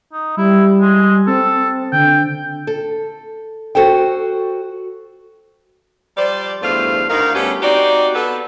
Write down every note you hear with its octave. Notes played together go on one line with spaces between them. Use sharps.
D#4
G3 E4
G#3
C4 A4
D3 G5
A4
F#4 A4 C5 G5
F3 G3 C5 D5
E2 G2 A3 F4 C5 F5
D2 D#3 D#4 A#4 F5
G3 A3 B3 C#4 G4
C4 D#4 F#4 G4 D5
B3 A4